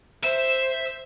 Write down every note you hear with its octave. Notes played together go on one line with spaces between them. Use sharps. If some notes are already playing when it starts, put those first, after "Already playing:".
C5 E5